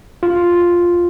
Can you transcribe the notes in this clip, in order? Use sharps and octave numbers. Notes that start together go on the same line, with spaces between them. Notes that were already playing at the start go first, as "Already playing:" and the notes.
F4